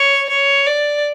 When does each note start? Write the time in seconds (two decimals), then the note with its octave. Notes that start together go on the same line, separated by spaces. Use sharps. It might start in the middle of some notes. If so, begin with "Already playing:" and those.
Already playing: C#5
0.29 C#5
0.67 D5